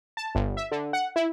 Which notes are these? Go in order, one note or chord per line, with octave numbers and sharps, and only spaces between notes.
A5
G1
E5
D3
F#5
E4